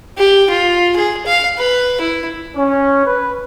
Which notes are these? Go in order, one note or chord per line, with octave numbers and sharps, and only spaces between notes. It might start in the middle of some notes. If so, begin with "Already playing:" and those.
G4
F4
G#4
F5
B4
E4
C#4
B4